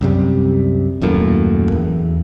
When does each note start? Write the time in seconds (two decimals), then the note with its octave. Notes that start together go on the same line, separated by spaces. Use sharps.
0.01 C2 F#2 C3 G3
1.01 D#1 F#2 A2 A#3
1.72 E2